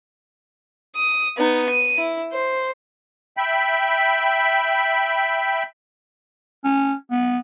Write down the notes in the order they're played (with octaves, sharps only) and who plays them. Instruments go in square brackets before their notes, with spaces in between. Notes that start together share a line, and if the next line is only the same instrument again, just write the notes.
[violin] D#6
B3 D#4
D#7
E4
C5
[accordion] E5 G5 B5
[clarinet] C#4
B3